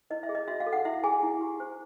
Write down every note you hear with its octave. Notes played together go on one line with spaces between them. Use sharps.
E4 D#5
E5
G#4
D#5
F#4 E5
F5
A4
F#5
E4 E5
G#4 G#5
E4
G4
C5